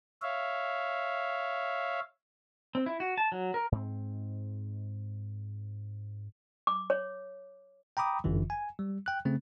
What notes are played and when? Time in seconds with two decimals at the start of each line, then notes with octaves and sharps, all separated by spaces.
0.22 C#5 E5 F5
2.75 C4
2.86 E4
3.00 F#4
3.18 A5
3.32 F#3
3.54 A#4
3.72 G#2 C4
6.67 D6
6.90 C#5
7.97 G5 A#5 B5 D6 D#6
8.24 G1 F#2 D3 E3
8.50 G#5
8.79 G3
9.06 G5 F#6
9.25 C#3 A3 C4